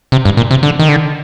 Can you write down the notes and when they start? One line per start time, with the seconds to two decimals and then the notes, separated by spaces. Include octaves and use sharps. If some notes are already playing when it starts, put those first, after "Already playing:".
0.12 C3
0.25 G2
0.37 A#2
0.51 C3
0.63 D3
0.80 D#3
0.89 D3